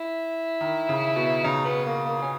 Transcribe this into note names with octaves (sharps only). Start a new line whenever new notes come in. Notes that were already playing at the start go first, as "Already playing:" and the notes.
Already playing: E4
D#3
C#3
B2
C#3 D#4
B3
A#3
A#3
C#4